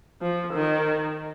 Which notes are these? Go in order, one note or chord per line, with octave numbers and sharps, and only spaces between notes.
F3
D#3